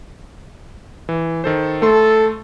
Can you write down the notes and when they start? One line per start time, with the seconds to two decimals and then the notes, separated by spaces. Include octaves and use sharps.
1.09 E3
1.44 D#3 A4 C5
1.82 A3 A4 C6